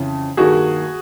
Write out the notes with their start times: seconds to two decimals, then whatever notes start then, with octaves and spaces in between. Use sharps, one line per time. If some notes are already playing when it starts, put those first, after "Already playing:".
Already playing: F2 C#3 E3
0.37 G2 D#3 F#3 A#3 F#4 G#4